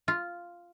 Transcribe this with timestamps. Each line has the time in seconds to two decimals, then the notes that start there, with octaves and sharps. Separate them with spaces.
0.08 F4